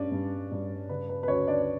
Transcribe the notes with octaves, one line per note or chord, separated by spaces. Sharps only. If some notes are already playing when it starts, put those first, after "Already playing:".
Already playing: G2 C#4 D4 D5
G2
G2
C#3 B4
B4
B4
D2 C#4 C#5
D4 D5